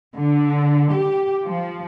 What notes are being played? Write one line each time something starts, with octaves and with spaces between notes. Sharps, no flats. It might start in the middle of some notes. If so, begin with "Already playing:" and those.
D3
G4
F3